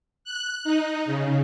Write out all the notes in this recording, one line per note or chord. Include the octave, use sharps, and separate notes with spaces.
F#6
D#4
C#3